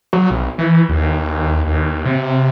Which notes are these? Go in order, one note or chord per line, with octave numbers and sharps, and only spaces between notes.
F#3
B1
E3
D#2
D#2
C3